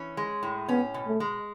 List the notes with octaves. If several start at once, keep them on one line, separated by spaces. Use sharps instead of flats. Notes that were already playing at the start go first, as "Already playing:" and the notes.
Already playing: E3 C#4
G#3
A2
B3 C#4
B2
A3
G#3